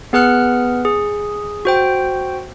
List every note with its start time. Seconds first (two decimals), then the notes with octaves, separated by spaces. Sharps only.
0.13 B3 G#4 B4 F#5 F6 F#6
0.85 G#4
1.65 F#4 C5 G5